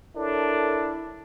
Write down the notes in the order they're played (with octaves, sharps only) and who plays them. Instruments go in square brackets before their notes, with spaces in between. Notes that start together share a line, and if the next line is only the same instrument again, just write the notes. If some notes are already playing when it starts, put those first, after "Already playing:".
[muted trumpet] D4 [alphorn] E4 [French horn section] A4 A#4 C#5